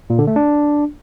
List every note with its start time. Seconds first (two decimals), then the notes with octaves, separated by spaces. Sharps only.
0.10 A#2
0.19 D3
0.27 A3
0.36 D4